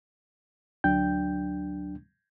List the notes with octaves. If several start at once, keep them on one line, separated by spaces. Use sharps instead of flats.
D2 F#3 D4 G5 G6